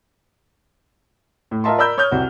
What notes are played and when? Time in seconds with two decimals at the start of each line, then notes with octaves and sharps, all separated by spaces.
1.51 A2
1.64 F4 A#4 D#5 E5 A5 C6
1.78 A#4 D5 B5 E6 G6
1.98 C#5 D#6 F6 G6
2.11 C2 C4 F#4